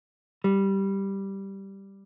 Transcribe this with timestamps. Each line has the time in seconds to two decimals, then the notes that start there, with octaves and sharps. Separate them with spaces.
0.44 G3